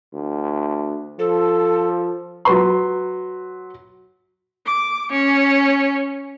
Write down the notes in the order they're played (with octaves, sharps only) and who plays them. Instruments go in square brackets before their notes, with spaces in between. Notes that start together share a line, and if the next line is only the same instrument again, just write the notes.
[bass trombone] D2
[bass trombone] F3 [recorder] A4
[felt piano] F#3 B4 C6
[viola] D6
C#4